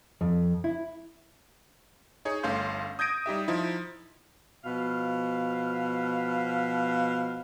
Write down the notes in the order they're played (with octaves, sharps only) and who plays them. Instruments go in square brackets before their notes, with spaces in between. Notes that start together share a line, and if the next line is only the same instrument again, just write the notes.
[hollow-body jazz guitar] F2
E4
[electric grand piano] D#4 G#4 C#5
G1 A3 C#4 F5 C6 G6
D#6 G6 G#6 A#6 D7 D#7
G3 D#4 G4 E5
F3 D#4 E4
[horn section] B2 F3 F5